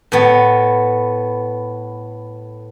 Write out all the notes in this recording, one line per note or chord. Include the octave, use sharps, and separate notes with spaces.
A2 B3